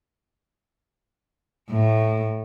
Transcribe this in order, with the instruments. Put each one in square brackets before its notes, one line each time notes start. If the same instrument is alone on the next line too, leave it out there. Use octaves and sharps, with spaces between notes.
[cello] A2